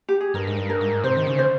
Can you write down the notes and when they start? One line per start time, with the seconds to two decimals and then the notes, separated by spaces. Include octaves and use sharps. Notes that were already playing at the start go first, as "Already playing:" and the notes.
0.09 G4
0.21 G#4
0.34 G2 A#4
0.47 G#2
0.57 G2
0.70 A#4
0.81 G#2
1.04 C3 C5
1.17 D#3
1.27 C#3
1.39 C5